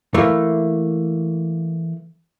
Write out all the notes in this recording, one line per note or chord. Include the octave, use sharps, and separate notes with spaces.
E3 A3 A#3